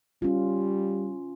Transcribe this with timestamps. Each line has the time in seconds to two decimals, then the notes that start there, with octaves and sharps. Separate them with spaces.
0.22 G3 C#4 F4